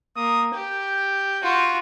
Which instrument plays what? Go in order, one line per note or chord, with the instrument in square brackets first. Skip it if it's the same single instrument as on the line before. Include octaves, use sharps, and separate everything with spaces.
[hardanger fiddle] A#3 [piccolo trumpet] D#6
[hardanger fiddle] G4 [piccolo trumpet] G6
[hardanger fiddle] F4 F#4